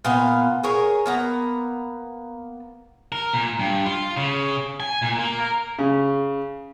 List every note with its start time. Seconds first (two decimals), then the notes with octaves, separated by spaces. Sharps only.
0.05 A#2 B3 F5
0.63 G#4 A#4 C#5
1.06 A#3 B3 A#5
3.12 A#4
3.34 A#2
3.59 G2
3.86 F4
4.17 C#3
4.80 G#5
5.02 A#2
5.19 A#3
5.39 A#4
5.79 C#3